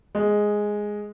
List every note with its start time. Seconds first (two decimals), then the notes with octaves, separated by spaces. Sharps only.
0.15 G#3